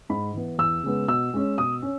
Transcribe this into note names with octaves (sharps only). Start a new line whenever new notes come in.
G#2 B5
E3 B3
E2 E6
C#3 G#3 B3
B2 E6
G#3 C#4
B2 D#6
C#4